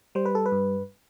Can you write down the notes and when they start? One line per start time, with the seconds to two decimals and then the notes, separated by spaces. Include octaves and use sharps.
0.15 G3 C5
0.26 B4
0.35 A4
0.46 B4
0.52 G2